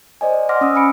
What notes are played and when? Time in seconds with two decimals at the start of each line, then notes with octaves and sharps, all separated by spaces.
0.21 C5 D5 D#5 G#5
0.49 F#5 G#5 C6 D6 F6 A#6
0.61 C#4 D#6 E6
0.76 G#5 B5 C#7 D7